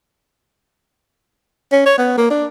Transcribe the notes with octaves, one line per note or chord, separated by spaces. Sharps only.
C#4
C#5
B3
A#3
D4